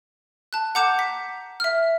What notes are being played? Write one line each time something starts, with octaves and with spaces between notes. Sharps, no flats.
A5 F#6
F#5 A#5 D6 G6 C#7 E7
B6
E5 F6